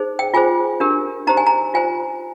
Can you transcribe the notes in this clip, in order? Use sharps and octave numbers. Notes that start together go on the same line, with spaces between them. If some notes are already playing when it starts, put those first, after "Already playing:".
Already playing: D#4 G#4 C5
G5
F4 G#4 C5 G#5
D4 G4 A#4
D#4 G4 C5 A#5
G#5
A#5
F4 C5 G#5